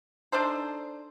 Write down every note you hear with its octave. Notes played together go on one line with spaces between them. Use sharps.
D4 D#4 A4 C5